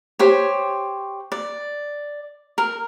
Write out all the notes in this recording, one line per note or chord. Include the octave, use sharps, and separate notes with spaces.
G4 C5 C#5
D5
A#4